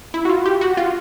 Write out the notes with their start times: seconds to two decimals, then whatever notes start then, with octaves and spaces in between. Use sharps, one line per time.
0.14 E4
0.25 F#4
0.29 F4
0.46 G4
0.61 F#4
0.77 F4